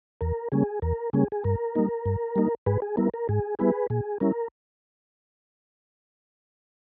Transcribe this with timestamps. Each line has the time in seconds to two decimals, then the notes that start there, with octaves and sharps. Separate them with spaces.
0.21 E2 A#4
0.52 C#3 G3 A#3 C#4 G#4
0.82 E2 A#4
1.13 C#3 G3 A#3 C#4 G#4
1.32 G#4
1.44 G2 A#4
1.75 G3 A#3 D#4
2.06 G2
2.36 G3 A#3 D#4
2.66 G#2 G#4 B4
2.82 G#4
2.97 G3 B3 E4 A#4
3.14 A#4
3.29 G#2 G#4
3.59 G3 B3 E4 G#4 B4
3.90 A#2 G#4
4.20 G3 C#4 E4 A#4